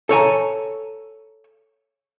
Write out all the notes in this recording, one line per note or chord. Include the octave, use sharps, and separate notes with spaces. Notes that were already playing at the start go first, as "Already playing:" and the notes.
A4 C#5 G#5 A#5